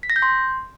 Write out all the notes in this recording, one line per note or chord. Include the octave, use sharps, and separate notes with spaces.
B6
A#6
G6
C6